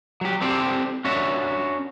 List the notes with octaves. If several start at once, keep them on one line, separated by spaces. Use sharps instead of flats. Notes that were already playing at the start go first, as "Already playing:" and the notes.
F#3 G4
C4 G4 A4 C5 D5
C#4 D4 F#4 E5